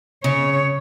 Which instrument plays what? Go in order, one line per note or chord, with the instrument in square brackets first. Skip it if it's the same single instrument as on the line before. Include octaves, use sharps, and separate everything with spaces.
[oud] C#3 [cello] C#5